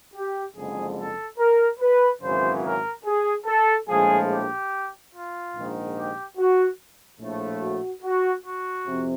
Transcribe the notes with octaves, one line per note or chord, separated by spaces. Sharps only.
G4
F#1 F2 D3 F3 G#3 G#4
A4
A#4
B4
G#1 F#2 C#3 E3 C5
A#4
G#4
A4
A#1 A2 F3 G#3 G#4
G4
F4
A#1 G#2 D#3
G4
F#4
A#1 A2 F3 A3
F#4
F#4
F#4
F2 C3